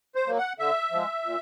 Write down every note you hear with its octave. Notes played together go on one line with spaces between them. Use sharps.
C5
F#3 A#3
F#5
D3 E5
F3 G#3
A#2